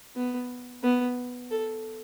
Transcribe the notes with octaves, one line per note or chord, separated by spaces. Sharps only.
B3
B3
A4